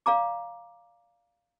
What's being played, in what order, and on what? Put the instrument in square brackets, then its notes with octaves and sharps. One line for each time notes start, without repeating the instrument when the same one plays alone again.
[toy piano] D5 F5 A#5 D6